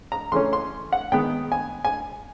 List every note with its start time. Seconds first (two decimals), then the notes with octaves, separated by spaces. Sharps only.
0.12 A#5
0.32 C#3 E3 A3 C#4 C6
0.53 C6
0.92 F#5
1.12 D#3 G#3 B3 G5
1.52 G#5
1.85 G#5